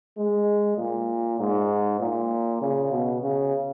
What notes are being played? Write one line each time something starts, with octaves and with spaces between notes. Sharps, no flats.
G#3
A#2
G#2
A#2
C#3
B2
C#3